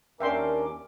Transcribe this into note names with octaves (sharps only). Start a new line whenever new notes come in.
D#2 C#4 D4 A#4 E5 G5 C6 D6